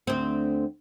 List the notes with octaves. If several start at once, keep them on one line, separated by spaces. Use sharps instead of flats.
D2 C4